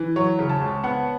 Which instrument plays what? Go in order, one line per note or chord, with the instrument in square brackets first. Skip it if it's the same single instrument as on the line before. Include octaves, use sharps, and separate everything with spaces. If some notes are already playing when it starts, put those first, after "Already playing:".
Already playing: [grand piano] E3
[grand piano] F#3 [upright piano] C#5
[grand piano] C#3
[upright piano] A5
[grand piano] C#2
[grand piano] B3 [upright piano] F#5